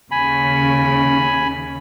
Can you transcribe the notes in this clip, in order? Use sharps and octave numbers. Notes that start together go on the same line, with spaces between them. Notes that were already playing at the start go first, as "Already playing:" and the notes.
D#2 C#3 G#5 B5